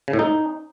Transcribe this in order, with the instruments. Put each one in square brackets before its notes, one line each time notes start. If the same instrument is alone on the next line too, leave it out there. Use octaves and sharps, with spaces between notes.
[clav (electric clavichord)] C#3
A2
D#4